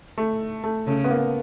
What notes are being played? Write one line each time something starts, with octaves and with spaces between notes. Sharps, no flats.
A3
A3
C#3 A3
B3
A#3